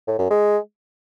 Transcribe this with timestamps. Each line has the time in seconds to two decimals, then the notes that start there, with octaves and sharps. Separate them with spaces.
0.08 A2
0.19 F#2
0.30 G#3